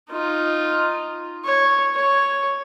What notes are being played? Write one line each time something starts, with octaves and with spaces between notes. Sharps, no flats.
D#4 F4
C#5
C#5